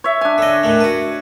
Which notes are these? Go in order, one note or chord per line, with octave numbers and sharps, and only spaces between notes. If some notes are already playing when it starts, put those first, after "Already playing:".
C#5 E5
D4 G#5
D3 D#5
A2 D#3 A3
F#4 B4